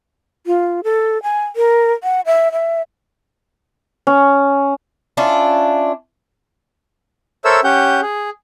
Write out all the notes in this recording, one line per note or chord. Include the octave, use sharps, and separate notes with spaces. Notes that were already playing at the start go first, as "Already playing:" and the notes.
F4
A4
G#5
A#4
F#5
E5
E5
C#4
C#4 D4 E4 F4
A4 A#4 C5 C#5 E5 E6
C#4 G4 F#5 G6
G#4